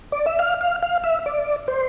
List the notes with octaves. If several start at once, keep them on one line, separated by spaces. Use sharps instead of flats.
D5
E5
F5
F5
F5
E5
D5
C5